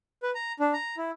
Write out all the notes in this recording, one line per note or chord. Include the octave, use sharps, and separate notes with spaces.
B4
A#5
D4
A#5
E4